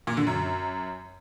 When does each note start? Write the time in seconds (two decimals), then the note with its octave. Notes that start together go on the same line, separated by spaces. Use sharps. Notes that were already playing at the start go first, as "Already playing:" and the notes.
0.07 A#2
0.17 D3
0.27 F#2